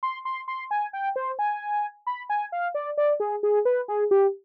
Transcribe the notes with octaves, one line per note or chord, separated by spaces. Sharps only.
C6
C6
C6
G#5
G5
C5
G#5
B5
G#5
F5
D5
D5
G#4
G#4
B4
G#4
G4